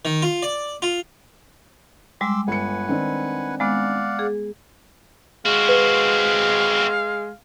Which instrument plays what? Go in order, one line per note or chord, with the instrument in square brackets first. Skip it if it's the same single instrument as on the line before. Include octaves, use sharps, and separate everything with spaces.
[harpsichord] D#3
F4
D5
F4
[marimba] G3 G#3 [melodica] C6 D6 E6
[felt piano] G1 C#7 [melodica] B4 F#5 G#5
[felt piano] D#3 C4 D4
[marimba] G#3 B3 [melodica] D5 F5 F#5
[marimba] G#4
[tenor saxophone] G#3 [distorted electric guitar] C4 F#4 [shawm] F5
[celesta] B4